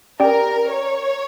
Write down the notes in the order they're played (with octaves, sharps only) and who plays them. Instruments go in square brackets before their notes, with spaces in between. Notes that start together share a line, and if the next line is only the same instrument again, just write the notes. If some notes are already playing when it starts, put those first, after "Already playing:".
[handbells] C#4 G4 D5 G5 [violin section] A#4
[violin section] C#5